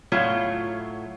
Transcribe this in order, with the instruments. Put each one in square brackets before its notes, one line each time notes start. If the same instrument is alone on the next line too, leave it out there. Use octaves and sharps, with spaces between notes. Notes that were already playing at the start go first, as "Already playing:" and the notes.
[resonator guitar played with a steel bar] A2 F#3 A3 F4 C#5